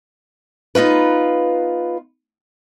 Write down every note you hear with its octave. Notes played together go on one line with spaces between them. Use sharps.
B3 D#4 F4 B4